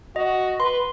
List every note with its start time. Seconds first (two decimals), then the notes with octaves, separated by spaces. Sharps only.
0.16 F#4 D#5
0.60 B4 C6